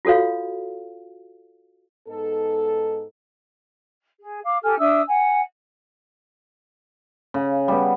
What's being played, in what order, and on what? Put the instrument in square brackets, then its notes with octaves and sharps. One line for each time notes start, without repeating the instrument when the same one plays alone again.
[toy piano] F4 F#4 A4 C#5 F5
[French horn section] G#2 B3 D#4 A4
[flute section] G#4
F5 D6
G4 A4 G#5 F6
D4 E5 D#6 E6
F#5 G#5
[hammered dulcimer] C#3
G3 B3